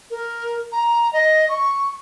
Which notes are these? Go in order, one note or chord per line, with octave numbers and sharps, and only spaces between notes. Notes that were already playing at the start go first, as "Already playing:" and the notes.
A#4
A#5
D#5
C#6